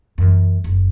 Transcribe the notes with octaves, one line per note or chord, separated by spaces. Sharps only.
F#2 E3
F#1